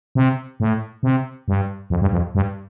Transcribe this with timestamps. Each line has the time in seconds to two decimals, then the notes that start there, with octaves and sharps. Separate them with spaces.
0.15 C3
0.60 A2
1.03 C3
1.48 G2
1.90 F2
2.01 G2
2.12 F2
2.35 G2